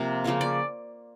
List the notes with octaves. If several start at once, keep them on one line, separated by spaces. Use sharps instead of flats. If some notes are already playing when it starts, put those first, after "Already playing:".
Already playing: C3 F3 A#3
C#3 F3 A#3 C#4
D5